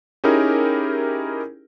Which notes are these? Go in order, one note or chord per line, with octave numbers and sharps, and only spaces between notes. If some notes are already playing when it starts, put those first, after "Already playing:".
C#4 D#4 E4 G4 G#4 A#4